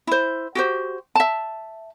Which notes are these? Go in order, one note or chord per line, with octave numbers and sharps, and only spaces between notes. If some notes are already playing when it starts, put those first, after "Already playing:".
E4 C5
F#4 G4 C5
E5 A5